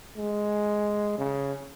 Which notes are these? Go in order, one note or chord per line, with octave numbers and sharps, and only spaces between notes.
G#3
C#3